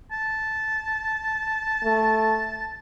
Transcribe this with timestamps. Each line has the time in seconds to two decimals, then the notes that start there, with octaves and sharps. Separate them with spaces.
0.11 A5
1.84 A3